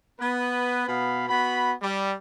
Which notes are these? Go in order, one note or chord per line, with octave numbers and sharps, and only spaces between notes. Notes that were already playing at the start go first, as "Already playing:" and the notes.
B3 B4
B2 B3 F5 B5
B3 F#4 B5
G3